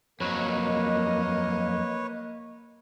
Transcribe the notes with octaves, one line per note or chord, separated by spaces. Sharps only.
F2 F#3 A#3 B4 C#5 D#5